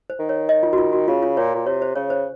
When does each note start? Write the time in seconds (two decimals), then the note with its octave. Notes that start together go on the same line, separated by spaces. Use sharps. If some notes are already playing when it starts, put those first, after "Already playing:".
0.10 C5
0.19 D#3
0.29 C#5
0.49 D#5
0.63 F4
0.73 F#4
0.78 F4
0.93 F#4
1.08 C#3 F4
1.23 F4
1.37 A#2 C#5
1.54 A#2
1.66 C3 C#5
1.82 C5
1.95 C#3 C#5
2.10 C5